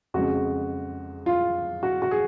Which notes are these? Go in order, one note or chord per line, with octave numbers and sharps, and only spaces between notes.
F2 C#3 G#3 F#4
F4
F#4
F#4
G#4